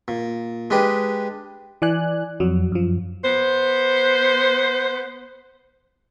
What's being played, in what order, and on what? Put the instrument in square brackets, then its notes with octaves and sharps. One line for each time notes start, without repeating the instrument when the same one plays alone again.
[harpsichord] A#2
G#3 D4 G4 B4 D#5
[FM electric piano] E3 D5 G#5 F#6
F2 F#3
F#2 F3
[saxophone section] B3 C5